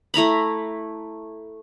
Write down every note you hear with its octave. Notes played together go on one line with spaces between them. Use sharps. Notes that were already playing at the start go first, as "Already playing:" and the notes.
A3 E4 A#5 B5